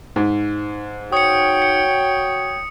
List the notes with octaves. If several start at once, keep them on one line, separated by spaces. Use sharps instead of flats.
G#2
F#4 C#5 G5 D#6 C#7
C#7